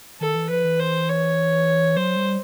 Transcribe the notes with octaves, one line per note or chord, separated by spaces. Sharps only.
D#3 A4
E3
F3 B4
E3
C5
C#5
F#3 C5
G3